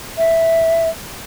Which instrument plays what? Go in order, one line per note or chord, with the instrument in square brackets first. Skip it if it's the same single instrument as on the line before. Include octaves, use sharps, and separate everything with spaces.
[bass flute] E5